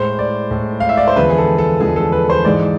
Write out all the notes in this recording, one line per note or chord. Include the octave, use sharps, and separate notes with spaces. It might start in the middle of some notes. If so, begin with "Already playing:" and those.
Already playing: A2 G#3 C5
D5
A2 G#3
F5
E5
D5
C5
E2 D3 F3 G#3 B4
G#4
A4
A4
E2 D3 F3 G#3 G#4
A4
B4
C5
G#2 E3 G#3 D5